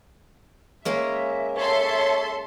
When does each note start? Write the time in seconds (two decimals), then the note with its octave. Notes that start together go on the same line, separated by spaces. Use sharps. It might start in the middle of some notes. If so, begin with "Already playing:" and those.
0.85 G#3 A#3 C#4 E5
1.57 A4 C#5 E5 C6